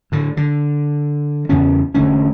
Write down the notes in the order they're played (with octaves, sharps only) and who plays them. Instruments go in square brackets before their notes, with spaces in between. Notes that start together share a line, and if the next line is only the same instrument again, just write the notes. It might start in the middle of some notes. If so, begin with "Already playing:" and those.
[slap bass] A2 D3
D3
E2 C#3 B3 C#4
E1 D3 A3 C#4